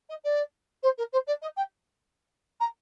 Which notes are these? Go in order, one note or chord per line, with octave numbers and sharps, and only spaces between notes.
D#5
D5
C5
A#4
C5
D5
D#5
G5
A#5